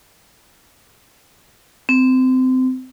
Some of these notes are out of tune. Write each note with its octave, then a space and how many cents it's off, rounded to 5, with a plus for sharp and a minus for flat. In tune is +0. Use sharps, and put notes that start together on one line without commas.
C4 -25